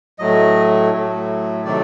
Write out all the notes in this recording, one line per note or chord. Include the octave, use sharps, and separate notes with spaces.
A2 F#3 A3 D#5
A2 F#3 A3
C3 D#3 F#3 A3 D5